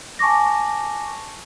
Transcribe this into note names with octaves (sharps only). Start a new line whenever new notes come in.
G#5 A5 C#6 D6 A#6